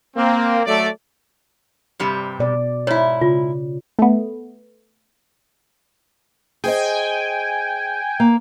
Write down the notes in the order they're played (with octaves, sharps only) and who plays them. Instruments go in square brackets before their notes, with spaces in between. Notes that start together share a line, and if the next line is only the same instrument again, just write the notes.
[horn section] A#3 C4
F#3 A3 A4 D5
[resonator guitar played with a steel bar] G2 C3 G3
[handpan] B2 D5
[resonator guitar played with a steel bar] G#2 E4 [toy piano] C#5
[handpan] C#3 [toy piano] F4
[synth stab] A3 B3
[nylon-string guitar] G#4 C5 D#5 [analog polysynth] G5 G#5
[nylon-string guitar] A#3